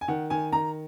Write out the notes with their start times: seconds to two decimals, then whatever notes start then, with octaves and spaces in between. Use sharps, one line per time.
0.01 G#5
0.08 D#3 F#5
0.30 D#3 G#5
0.52 D#3 A#5